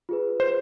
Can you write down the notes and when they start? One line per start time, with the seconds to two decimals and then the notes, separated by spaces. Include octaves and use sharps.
0.09 F4 G#4 B4
0.40 C5